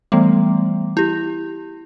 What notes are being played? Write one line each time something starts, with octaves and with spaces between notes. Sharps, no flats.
E3 G3 A3 B3
E4 G4